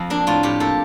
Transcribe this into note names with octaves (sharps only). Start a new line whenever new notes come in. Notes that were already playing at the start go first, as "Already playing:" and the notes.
Already playing: F2 C4
A#3 D4
A2 F4
A2 G4
A#3 A4